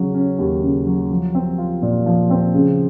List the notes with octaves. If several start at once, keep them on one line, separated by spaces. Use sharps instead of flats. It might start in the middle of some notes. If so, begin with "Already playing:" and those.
Already playing: C#3 F#3
C#4
D#2
C#3
F#3
F3
C4
F4
A#2
F3
C4
C#3